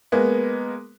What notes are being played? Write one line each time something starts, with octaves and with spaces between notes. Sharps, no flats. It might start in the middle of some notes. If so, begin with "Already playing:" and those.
G#3 A#3 B3